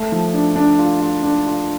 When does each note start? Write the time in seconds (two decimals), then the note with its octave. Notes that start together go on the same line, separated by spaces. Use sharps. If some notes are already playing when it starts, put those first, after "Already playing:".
Already playing: A3
0.12 F3
0.34 D4
0.56 D4
0.79 F4
1.01 F4
1.23 D4
1.46 F4